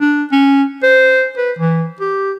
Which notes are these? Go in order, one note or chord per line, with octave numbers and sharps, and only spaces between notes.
D4
C#4
C5
B4
E3
G4